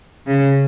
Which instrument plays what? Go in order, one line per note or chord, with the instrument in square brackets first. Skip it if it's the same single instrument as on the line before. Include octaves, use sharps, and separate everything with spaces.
[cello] C#3